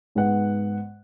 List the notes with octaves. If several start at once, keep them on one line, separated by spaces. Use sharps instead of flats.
G#2 G#3 B3 F#5